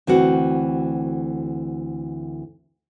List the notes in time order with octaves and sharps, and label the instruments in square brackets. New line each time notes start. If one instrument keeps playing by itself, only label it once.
[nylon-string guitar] D2 E3 C4 F#4